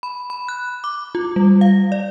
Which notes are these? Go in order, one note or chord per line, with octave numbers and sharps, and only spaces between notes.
B5
B5
F#6
D6
F4
G3
F5
D5